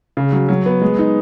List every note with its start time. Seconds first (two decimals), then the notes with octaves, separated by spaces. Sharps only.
0.17 C#3
0.32 F#3
0.49 F#3
0.66 B3
0.81 G#3
0.98 D#4